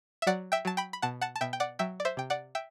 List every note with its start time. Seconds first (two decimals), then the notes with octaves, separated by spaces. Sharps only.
0.22 E5
0.27 F#3 D5 F#5
0.52 E5 G5
0.65 F#3 A5
0.77 G5 B5
0.93 B5
1.02 B2 F#5 A5
1.21 F#5 A5
1.36 A5
1.41 B2 E5 G5
1.53 G5
1.60 D5 F#5
1.79 F#3 E5 G5
2.00 D5
2.05 C5 E5
2.17 C3 G5
2.30 D5 F#5
2.55 E5 G5